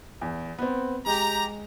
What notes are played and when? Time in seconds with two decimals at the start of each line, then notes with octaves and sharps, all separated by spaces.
0.21 E2
0.59 B3 C4
1.06 G#3 G4 A#5